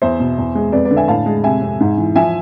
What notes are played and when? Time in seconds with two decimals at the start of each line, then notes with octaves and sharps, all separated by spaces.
0.02 E2 C5 E5
0.20 B2
0.38 E2
0.55 G#3
0.72 F2 B4 D5
0.85 B4 D5
0.91 D3
0.96 E5 G#5
1.08 A2 F5 A5
1.26 G#3
1.44 C3 E5 G#5
1.61 F2
1.80 G#2
1.98 E3
2.16 F3 E5 G#5